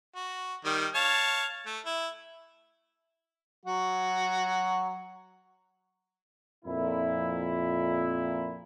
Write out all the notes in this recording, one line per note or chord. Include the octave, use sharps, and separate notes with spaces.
F#4
D#3 G3
C#5 F5 A5
A3
E4
F#3 F#4
F2 A#2 E4